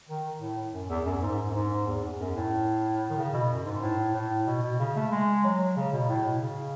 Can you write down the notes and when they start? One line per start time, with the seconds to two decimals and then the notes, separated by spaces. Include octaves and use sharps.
0.09 D#3
0.41 A2
0.73 F#2
0.90 E2
1.05 F#2
1.22 G#2
1.50 F#2
1.55 G#2
1.87 E2
2.03 E2
2.20 F#2
2.36 A2
3.10 D#3
3.17 C#3
3.33 B2
3.50 F#2
3.66 G#2
3.82 A2
4.14 A2
4.47 B2
4.63 B2
4.79 C#3
4.96 A3
5.12 G#3
5.44 F#3
5.76 C#3
5.93 B2
6.09 A2
6.25 B2
6.42 C#3